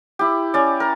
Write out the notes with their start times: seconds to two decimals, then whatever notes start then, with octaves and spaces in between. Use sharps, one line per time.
0.19 E4 G4
0.54 C#4 D5
0.80 A#4